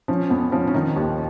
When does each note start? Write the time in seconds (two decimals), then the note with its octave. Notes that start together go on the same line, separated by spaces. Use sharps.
0.08 F3 C#4
0.30 F2 B3
0.52 F3 C#4
0.67 C#4
0.74 D#3 D#4
0.96 D#2